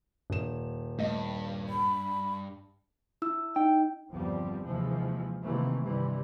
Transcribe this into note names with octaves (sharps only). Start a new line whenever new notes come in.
D#1 G2 E7
G2 A3 D#5
B5
E4 E6
D#4 G5
G1 E2 F3 G3 C4
D#2 C3 E3 F3 G#3
C3 D#3 E3 A3 A#3 C4
G2 C3 D#3 E3 G3